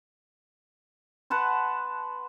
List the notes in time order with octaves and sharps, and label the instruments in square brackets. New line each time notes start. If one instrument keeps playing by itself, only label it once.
[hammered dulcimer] B4 F#5 A5 C6